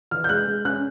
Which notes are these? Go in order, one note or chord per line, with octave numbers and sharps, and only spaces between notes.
E3 F6
G6
G#3 F#6
G#3
C#4 F#6